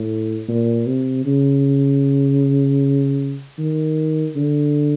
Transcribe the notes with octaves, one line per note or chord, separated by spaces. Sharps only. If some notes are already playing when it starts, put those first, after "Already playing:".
Already playing: A2
A#2
C3
C#3
D#3
D3